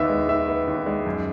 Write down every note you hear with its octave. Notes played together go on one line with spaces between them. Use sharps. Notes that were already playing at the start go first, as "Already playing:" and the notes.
Already playing: D#2 D#3 B3 D#5 E5
G#3
D#3 E5
B3
D#2
G#3
F#2